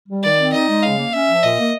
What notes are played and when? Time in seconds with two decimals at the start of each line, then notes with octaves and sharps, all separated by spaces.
0.08 G3
0.23 D#3 D5
0.38 C4
0.53 D#4 D#5
0.68 G#3
0.83 C#3 F5
0.98 A#3
1.13 C#4 E5
1.28 F3
1.43 A#2 D#5
1.58 A#3